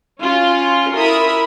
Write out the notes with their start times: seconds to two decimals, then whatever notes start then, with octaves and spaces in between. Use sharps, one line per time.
0.23 C#4 F4
0.95 E4 A#4 E5 B5 D#6